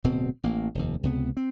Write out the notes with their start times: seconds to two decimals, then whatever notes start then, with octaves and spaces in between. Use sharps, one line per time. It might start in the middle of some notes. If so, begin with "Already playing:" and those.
0.04 D1 B2 C4
0.44 A1 A#3
0.75 F1 D#2
1.03 C#2 C3 B3
1.37 C4